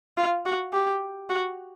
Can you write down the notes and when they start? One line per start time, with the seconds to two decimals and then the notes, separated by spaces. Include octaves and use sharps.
0.17 F4
0.46 F#4
0.73 G4
1.30 F#4